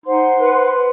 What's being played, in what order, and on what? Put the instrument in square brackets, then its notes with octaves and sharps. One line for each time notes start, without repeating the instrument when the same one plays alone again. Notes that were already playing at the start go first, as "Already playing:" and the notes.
[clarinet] D#4 [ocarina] C5 [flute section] F#5 C6
[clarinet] B4